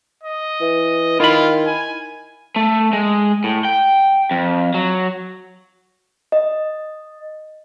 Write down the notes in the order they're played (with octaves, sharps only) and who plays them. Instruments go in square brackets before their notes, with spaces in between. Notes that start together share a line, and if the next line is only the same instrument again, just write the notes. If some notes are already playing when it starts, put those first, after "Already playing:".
[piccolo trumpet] D#5
[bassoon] E3
[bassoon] D#3 [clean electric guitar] E4 B5 [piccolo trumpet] F4
[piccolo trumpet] G#5
[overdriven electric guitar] A3
G#3
A2
G5
F2
F#3
[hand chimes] D#5